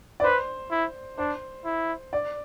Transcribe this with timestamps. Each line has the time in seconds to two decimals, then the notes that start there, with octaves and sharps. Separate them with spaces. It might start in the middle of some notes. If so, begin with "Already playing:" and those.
0.20 D5
0.23 B4 C5
0.71 E4
1.18 D4 C5
1.65 E4
2.13 D5